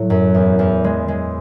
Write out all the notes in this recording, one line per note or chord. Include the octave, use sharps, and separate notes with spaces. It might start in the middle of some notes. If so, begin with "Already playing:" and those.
Already playing: A2 F#3 A3
F#2
E2
E2
G#3
G#3